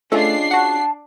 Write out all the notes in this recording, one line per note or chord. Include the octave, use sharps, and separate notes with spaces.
A3 C#4 D4 F4 G#4 A4 D#5 C7
F#4 F#5 A5